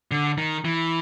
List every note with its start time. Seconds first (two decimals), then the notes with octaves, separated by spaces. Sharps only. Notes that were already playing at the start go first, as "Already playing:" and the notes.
0.11 D3
0.38 D#3
0.65 E3